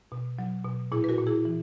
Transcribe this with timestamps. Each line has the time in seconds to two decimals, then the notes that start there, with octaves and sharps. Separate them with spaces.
0.12 B2
0.39 F#3
0.65 B2
0.92 A#2 E4 G#4
1.04 B4
1.09 F#4 A#4
1.19 A#2
1.27 E4 G#4
1.45 E3